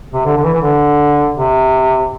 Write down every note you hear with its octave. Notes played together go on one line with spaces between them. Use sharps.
C3
D3
D3
E3
E3
D3
C3